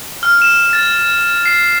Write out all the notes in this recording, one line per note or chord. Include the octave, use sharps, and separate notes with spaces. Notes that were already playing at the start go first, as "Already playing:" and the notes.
F6
E7
A6
C7